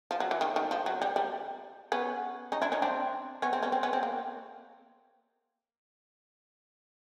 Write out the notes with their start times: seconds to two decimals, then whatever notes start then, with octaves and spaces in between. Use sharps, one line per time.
0.11 F3
0.20 F#3
0.31 E3
0.41 D#3
0.56 D#3
0.71 F3
0.86 F#3
1.02 G3
1.16 G3
1.92 B3 C#4
2.52 C#4 D#4
2.62 D4 E4
2.72 C#4 D#4
2.82 C4 D4
3.42 B3 C#4
3.53 C4
3.62 B3 C#4
3.72 C4
3.83 B3 C#4
3.93 C4
4.03 A#3